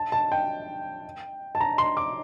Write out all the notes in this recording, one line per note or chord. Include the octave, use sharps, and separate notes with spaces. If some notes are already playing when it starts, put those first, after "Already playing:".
Already playing: A5
A5
G5
A5
A#5
C6
D6